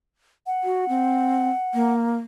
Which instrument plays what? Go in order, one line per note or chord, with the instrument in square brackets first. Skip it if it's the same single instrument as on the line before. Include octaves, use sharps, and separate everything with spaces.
[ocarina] F#5
[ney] F#4
C4
A#3